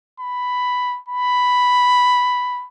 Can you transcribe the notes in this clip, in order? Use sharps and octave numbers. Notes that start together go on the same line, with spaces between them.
B5
B5